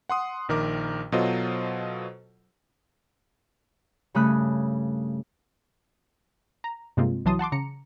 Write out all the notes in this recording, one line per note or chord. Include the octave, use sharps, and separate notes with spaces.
F#5 C6 D#6
A#1 D#3 A#4 D6
B2 F#3 F4 A4 C5 D#5
G2 C#3 A3 B5 D#6 F#6
A#5
G2 C3 G#3 A#3 C4 F4
C2 E3 F#3 A5 C6 D#6
F#5 A5 C6 D6
C#3 A#5 C#7